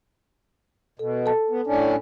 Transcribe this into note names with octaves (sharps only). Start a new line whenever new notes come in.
B2 A4
A4 A5
B3
A2 C#4 D4